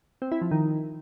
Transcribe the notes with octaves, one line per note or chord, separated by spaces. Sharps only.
C4
E4
F3
D#3